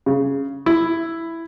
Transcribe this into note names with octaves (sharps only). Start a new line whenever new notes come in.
C#3
E4